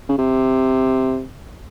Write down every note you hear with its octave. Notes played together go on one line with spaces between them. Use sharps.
C#3
C3